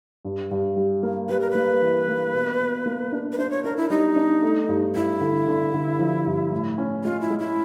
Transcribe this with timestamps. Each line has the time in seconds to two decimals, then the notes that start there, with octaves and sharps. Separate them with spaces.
0.25 G2
0.51 G2
0.76 G3
1.03 A#3
1.29 G3 B4
1.41 A#4
1.50 A#3 B4
1.82 E3
2.08 A#3
2.34 B2
2.60 B2
2.86 A#3
3.12 D4
3.32 B4
3.38 D4 C5
3.51 C#5
3.64 D4 A#4
3.77 E4
3.90 G3 D#4
4.16 D4
4.42 A3
4.69 G2
4.95 G2 E4
5.21 D3
5.48 D3
5.74 D3
5.99 F3
6.26 G2
6.52 A2
6.78 C#4
7.04 G#3 F4
7.21 E4
7.30 G#3
7.39 E4